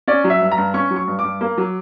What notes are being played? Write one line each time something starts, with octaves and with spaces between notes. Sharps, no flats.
C#4 D5
F#3
E5
G2
A#5
G2
C#4 C#6
F#3
C#6
G2
G2 D6
A#3
F#3